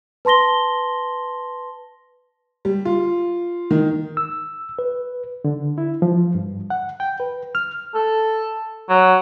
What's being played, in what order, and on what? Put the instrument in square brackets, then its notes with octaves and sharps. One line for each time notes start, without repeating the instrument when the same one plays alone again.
[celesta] B4 A5 C6 A#6 G7
[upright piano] G3
F4
D#3
[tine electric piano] E6
B4
[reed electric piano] D3
E4
F3
G2
F#5
G5
B4
F6
[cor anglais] A4
F#3